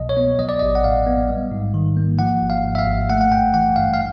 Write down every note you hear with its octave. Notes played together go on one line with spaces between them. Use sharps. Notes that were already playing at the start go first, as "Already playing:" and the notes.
Already playing: C2 B2 F#3 D#5
C#5
B3
F#3 D#5
D5
D#5
A1
F#5
A2 F5
B3
G3
G#2
D#3
A#3
F3 F#5
G#1
F5
G#2
E5
F5
G#1
A3 F#5
F#5
G2 G5
E3 F#5
G2 F5
F5